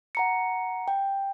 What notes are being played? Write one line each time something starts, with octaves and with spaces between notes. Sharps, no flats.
F#5 A#5 C#7
G5